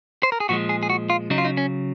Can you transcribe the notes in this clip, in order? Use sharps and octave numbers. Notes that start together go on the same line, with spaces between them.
C5
A#4
G#4
A#2 F3 G#3 F#4
G#4
G#4
F#4
F4
C#3 F#3 D#4
F4
D#4
C#4